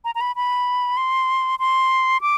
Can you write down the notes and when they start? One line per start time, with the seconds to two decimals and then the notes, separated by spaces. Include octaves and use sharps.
0.05 A#5
0.15 A#5
0.21 B5
0.36 B5
0.97 C6
1.59 C6
2.21 D6